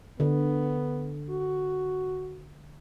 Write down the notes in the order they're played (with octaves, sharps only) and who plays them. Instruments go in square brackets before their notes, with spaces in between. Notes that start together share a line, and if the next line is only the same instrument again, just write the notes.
[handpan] D3 [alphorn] B3
[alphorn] F#4